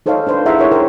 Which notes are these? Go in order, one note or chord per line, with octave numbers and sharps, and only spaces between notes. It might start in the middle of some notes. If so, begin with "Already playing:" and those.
D#4 A4 C5 C#5 D#5 F5
D4 B4 C5
E4 G#4 E5 F#5 A#5 C6
A#4 C#5 F#5
A#4 C5 G5